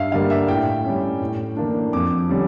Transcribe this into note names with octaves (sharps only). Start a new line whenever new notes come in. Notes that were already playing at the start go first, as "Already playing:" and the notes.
Already playing: G2 E5 F5
D3 G3 A#3 F5
E5
A2 G5
G3 C#4
A2
E3 A#3 D4
F2 D6
D3 G3 C#4